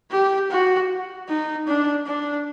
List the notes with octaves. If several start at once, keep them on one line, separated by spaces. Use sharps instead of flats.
G4
F#4
D#4
D4
D4